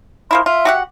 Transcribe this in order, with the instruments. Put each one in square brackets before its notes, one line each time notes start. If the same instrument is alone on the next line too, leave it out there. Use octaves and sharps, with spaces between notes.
[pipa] F3 A#3 E4 [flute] C6
[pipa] F4 [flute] E5
[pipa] F#4 G4 F#5